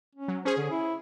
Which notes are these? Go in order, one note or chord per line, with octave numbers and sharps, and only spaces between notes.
C#4
F#3
C#4 G#4 C5
D3
E4